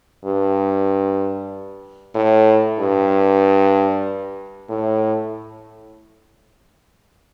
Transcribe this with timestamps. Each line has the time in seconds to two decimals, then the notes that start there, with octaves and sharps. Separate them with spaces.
0.25 G2
2.15 A2
2.79 G2
4.69 A2